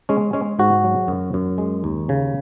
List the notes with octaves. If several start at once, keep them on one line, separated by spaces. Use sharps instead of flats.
G#3 C#4
G#3 C#4
G#2 F#4
F#3
F#2
F#2
G#3
D#2
C#3